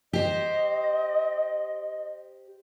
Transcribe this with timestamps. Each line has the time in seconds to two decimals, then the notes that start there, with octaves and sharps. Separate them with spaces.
0.13 G4 C5 D#5